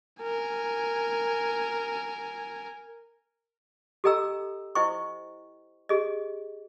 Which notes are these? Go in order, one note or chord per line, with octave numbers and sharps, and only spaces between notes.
A#4 G#5
G4 A4 D#5 G5 A#5 E6
E4 C5 D#5 G5 C#6
G4 G#4 D#5